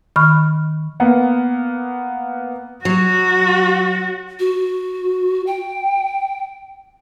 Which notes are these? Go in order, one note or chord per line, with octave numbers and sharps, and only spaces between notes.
D#3 B5 C#6 F6
A#3 B3
F#3 F#4
F#4
G5